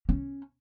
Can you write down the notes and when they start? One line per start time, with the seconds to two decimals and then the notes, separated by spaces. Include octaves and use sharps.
0.09 C#4